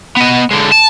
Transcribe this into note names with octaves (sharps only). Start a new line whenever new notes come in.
B3 D#5
D3 G#3
A5